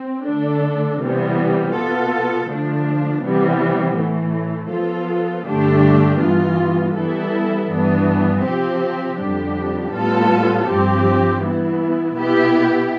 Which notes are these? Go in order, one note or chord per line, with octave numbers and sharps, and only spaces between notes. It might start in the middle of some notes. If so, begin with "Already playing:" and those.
Already playing: C4
D3 A3 D4 A4
C3 E3 G3 B3
B2 B3 F4 A4
D3 F3 A3 D4
C3 E3 G3 B3
A2 E3 A3
F3 B3 F4 A4
G2 D3 A3 D4 G4
G2 E3 B3 F4
E3 G3 B3 E4 A4
G2 E3 B3 D4
C3 F3 C4 G4
F2 D3 G3 D4 G4
A2 G3 B3 F4 A4
G2 F3 C4 G4
E3 B3 E4
B2 B3 E4 G4